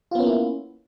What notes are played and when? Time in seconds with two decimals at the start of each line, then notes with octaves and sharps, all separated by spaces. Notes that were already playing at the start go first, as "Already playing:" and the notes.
0.11 F4
0.15 B3
0.19 C#4
0.23 A#3
0.26 E4